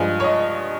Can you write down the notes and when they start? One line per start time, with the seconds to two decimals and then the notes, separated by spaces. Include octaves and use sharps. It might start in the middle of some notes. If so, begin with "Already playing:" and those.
Already playing: G2 F3 G#3 G#5
0.20 C#5
0.24 D#5